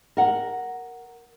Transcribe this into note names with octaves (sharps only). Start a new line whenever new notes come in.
A#4 F#5